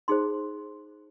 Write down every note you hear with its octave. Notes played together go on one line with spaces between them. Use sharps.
D#4 G#4 C5 C6